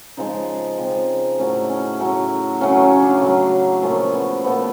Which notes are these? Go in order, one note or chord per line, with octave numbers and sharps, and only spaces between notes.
C#3 F3 G#3 D#4
C#3 F3 G#3 C4
A2 F#3 A3 C#4
C#4
A2 F#3 A3 C#4
C#3 F#3 A3 C#4
C#4
D4
C#3 F#3 A3
A#2 F3 A3 C#4
B3
A#2 F3 A3 B3